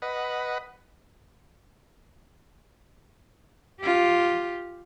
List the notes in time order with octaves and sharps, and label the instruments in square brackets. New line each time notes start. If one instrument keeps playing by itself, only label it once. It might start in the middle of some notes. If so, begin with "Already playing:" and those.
[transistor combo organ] B4 D#5 F#5
[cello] F4 G4